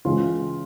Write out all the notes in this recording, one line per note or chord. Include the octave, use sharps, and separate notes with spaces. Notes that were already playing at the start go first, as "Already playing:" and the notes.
C#2 C#3 E3 G#3 F4